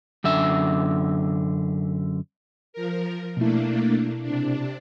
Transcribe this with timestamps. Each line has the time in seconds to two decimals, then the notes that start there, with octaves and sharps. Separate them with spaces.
0.24 F#2 D3 E5
2.73 F3 A#4
3.37 B2 A3 A#3 D4 E4
4.23 C3 D4